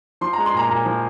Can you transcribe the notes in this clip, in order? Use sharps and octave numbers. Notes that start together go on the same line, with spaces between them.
F3 C6
G#3 A#5
C6
A#2 A#5
A#2 A#5
F3